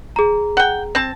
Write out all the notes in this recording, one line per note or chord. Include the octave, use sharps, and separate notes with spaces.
G#4 A#5
F#5 G5
C4 A5